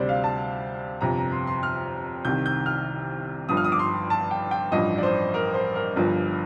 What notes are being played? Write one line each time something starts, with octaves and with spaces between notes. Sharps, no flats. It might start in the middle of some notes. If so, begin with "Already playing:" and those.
Already playing: D2 C3 G3 C5 D5
F5
A5
G1 F2 C3 A#5
A#5
C6
C6
F6
C2 C3 D#3 G6
G6
F6
G1 G2 F3 D#6
F6
D#6
D6
C6
A5
G5
G5
A1 G2 F3 D#5
D5
C5
A#4
C5
A#4
G1 G2 F3